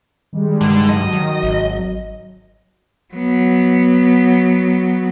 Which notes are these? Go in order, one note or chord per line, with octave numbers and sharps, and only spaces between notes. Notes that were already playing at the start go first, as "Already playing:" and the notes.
D#3 G3 G#3
G2 D3
G2 F#3 D#5
D#3
G#1
F#3 B3